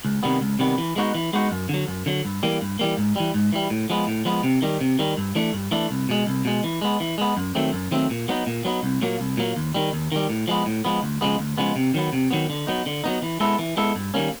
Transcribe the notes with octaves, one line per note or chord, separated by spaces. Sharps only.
C#2
C3 D#3 G3 B3
C#2
C3 D#3 G3 B3
E3
G#3 B3 D#4 F#4
E3
G#3 B3 D#4 F#4
F#2
D3 F#3
F#2
D3 F#3
G2
E3 G3 A#3
G2
E3 G3 A#3
G#2
E3 G3
G#2
E3 G3
A2
F3 G#3 B3
A2
F3 G#3 B3
C3
D#3 G3
C3
D#3 G3
G2
E3 A3 D4
G2
E3 A3 D4
C2
B2 G#3
C2
B2 G#3
E3
G#3 B3
E3
G#3 B3
F#2
D#3 F#3 A3 C4
F#2
D#3 F#3 A3 C4
A#2
F#3 B3 D#4
A#2
F#3 B3 D#4
C2
A#2 F#3 A#3
C2
A#2 F#3 A#3
D#2
D#3 G3
D#2
D#3 G3
A2
F3 G#3 B3
A2
F3 G#3 B3
D2
C#3 F3 G#3 B3
D2
C#3 F3 G#3 B3
C3
D#3 F#3 B3
C3
D#3 F#3 B3
D3
F#3 B3 D#4
D3
F#3 B3 D#4
E3
G#3 B3 E4 A4
E3
G#3 B3 E4 A4
G2
D#3 G3 A#3 C#4